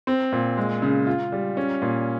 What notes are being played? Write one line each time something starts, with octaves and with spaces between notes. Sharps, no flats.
C4
A#2
G#3
C#3
F4
G3
C#4
A#2